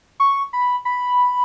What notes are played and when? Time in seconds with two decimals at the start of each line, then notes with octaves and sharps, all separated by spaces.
0.20 C#6
0.53 B5
0.85 B5